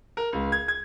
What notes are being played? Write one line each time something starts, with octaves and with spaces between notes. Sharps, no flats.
A#4
C#2
G#6
G#6